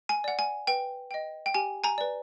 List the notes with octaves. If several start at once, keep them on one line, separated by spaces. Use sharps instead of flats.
G#5
D5 F#5
G#5
B4 G5
D#5 G5
G5
G4 G#5
G#5 A#5
B4 D5